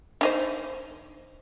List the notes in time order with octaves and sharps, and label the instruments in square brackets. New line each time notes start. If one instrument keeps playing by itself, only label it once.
[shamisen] D4 D#4 C5